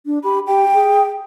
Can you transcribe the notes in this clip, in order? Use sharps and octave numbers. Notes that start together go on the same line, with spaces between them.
D4
G4 B5
G4 G5
G#4